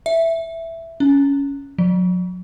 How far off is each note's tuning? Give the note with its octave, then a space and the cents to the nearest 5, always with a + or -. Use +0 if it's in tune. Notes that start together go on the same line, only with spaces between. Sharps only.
E5 +5
C#4 +15
F#3 -40